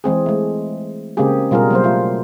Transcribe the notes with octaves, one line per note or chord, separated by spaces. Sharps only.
E3 G#3 C4 G#4
G#3 A3
C#3 G#3 A#3 C4 G4 G#4
B2 G3 F4 G#4 A#4
F#3 G3 A#3 C5
A3 F4